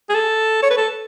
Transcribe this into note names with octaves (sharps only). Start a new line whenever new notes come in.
G#4
A4
C#5
B4
A4